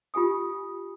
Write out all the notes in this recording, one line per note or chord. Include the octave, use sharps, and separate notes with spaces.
F4 G4 G#5 D#6